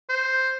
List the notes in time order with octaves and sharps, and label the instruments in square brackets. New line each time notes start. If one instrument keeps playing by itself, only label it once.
[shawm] C5